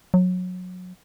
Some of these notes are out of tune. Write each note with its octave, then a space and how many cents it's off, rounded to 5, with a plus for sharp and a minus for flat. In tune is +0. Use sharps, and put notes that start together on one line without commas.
F#3 -25